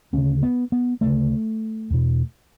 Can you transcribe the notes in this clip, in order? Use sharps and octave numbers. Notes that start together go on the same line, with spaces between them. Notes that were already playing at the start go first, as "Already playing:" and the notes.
D2 C#3 C#4
B3
B3
D2 C#3 A3
E2 B2